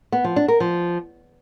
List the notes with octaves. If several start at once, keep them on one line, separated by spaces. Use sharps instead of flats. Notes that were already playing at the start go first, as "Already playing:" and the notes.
B3
F3
D4
A#4
F3